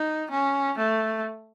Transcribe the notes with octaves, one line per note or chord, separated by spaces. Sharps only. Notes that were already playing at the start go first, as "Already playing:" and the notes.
Already playing: D#4
C#4
A3